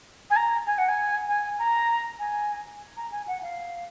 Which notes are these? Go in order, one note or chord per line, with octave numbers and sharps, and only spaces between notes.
G#5
A#5
G#5
F#5
G#5
G#5
A#5
G#5
A#5
G#5
F#5
F5